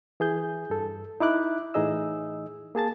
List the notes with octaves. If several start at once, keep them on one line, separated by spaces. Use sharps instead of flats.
E3 G#4 G6
G2 A4
D#4 E4 D6 F#6
A2 E3 D#4 G#4 D#5 E6
A#3 G#4 A5 A6